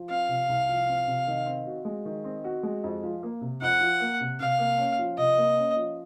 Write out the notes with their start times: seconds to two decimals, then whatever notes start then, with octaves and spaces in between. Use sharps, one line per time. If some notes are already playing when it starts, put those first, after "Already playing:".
Already playing: F3
0.09 C4 F5
0.28 C3
0.49 C2
0.68 F3
0.88 C4
1.07 C3
1.27 D#3
1.46 C4
1.66 F#4
1.85 G#3
2.05 D#3
2.24 C4
2.44 F#4
2.63 G#3
2.84 F2
3.03 F3
3.23 A#3
3.41 C3
3.61 F2 F#5
3.81 F3
4.00 A#3
4.20 C3
4.40 C3 F5
4.59 A#3
4.78 C#4
4.99 F3
5.17 C3 D#5
5.37 A#3
5.57 C#4
5.76 F3